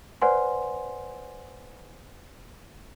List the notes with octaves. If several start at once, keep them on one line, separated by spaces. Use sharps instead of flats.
B4 C5 D5 F#5 G#5 C6